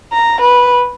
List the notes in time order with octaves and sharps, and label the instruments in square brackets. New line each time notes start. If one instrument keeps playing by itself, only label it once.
[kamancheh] A#5
B4